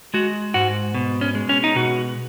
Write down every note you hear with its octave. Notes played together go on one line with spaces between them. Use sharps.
G#3 F#4
G#2 F#4
B2
C#4
G#3
C#4
D#4
B2 F#4